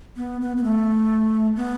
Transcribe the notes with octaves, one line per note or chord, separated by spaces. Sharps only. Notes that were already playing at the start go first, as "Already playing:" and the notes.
B3
B3
B3
A3
B3